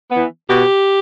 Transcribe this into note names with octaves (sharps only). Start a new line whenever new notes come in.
E3 B3
B2 G4